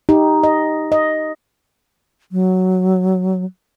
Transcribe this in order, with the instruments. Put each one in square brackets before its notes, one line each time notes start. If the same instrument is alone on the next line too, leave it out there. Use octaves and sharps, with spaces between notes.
[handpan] D#4 G4
D#5
D#5
[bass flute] F#3